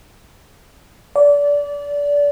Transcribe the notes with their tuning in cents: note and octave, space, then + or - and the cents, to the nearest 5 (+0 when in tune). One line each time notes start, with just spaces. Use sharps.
D5 -25